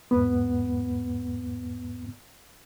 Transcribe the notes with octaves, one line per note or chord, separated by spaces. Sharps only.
E2 G#2 B3